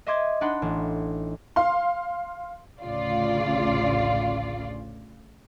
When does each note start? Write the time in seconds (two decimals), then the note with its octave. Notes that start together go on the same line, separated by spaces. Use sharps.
0.06 D#5 E5 C6 D6 D#6 G#6
0.41 D4 D#4 F#5 B5 C6
0.62 A1
1.56 F5 C6
2.83 A1 D2 C#3 F4 D5